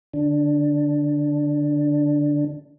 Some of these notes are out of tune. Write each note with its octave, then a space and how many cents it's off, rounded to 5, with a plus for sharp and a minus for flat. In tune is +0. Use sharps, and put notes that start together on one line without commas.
D3 +0 D4 +0